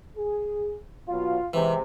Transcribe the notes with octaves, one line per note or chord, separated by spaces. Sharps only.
G#4
B2 F#3 F4
C3 E3 G#3 C4